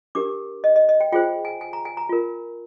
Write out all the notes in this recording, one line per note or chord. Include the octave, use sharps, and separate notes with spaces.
D4 G4 A#4 D6
D#5
D#5
D#5
G5
F4 G#4 C5 G5
G#5
G#5
A#5
G#5
A#5
F4 A#4